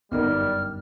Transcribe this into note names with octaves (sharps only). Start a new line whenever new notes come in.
G1 F#2 G3 B3 D#4 A#4 F6